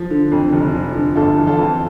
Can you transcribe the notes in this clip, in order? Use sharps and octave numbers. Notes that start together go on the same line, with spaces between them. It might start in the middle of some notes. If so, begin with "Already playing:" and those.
Already playing: F3
D3
F2
F1
F3
D3
G1 F4 A4
E3
F4 A4
F2